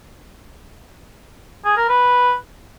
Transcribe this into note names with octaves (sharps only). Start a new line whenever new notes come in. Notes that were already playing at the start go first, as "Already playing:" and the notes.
G#4
A#4
B4